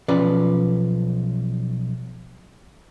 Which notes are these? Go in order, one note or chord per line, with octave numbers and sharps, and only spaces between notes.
B1 F3 C#4 B4 D5